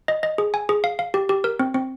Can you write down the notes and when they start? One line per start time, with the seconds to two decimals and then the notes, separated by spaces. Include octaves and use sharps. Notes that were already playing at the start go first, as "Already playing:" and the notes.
0.08 D#5
0.23 D#5
0.38 G#4
0.54 G#5
0.69 G#4
0.84 F5
0.99 F5
1.14 G4
1.29 G4
1.44 A#4
1.59 C4
1.74 C4